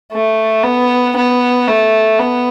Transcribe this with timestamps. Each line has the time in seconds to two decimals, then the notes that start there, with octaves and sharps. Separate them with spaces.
0.12 A3
0.63 B3
1.16 B3
1.68 A3
2.19 B3